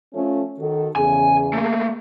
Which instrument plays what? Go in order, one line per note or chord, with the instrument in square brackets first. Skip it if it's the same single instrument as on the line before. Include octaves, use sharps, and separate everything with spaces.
[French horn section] F3 A3 C#4
D#3 F#4 A4
[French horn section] E2 C#3 G#4 [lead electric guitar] G#5
[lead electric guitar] A3 A#3